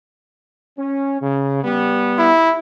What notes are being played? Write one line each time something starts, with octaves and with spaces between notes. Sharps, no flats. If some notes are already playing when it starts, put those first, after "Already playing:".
C#4
C#3
G3 B3
E4